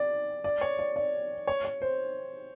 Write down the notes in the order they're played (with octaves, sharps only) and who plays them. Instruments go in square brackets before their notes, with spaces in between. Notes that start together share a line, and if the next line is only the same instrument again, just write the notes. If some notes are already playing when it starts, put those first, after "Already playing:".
Already playing: [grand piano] D5
D5
C#5
D5
D5
C#5
C#5
C5